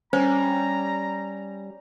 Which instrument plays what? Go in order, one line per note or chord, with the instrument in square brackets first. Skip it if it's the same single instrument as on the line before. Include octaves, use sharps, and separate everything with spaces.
[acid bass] G3 [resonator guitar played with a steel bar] C#4 [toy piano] C5 [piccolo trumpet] A#5